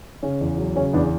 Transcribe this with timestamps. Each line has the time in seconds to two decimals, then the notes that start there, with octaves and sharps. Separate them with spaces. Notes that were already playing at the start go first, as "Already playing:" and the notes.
0.23 C#3 C#4
0.41 E2
0.58 F#3
0.76 C#3 C#4
0.93 E2 B3 D4